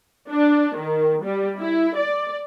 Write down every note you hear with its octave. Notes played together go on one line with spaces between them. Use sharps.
D4
D#3
G3
E4
D5